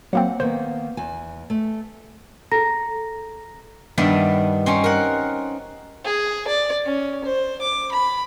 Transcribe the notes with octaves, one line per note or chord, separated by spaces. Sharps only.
F#3 A#3 C4 F#5
D#3 A#3 B3 C5
E2 G#5
A3
G#4 A4 A#5 A#6
G2 D#3 B3 D4 E5
C4 C#4 D#4 C6
A#4 F#5
G#4
D5
C#4
C5
D6
B5